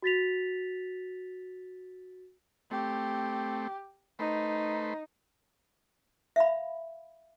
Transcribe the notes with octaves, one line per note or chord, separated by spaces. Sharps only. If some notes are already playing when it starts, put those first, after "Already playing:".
F#4 A6 B6 F7
A3 C4 G4
A3 D#4 B4 C5
E5 F5 B5